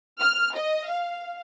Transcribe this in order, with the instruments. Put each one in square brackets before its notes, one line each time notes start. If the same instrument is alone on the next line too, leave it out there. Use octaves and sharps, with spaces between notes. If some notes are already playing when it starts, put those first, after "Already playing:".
[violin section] F6
D#5
F5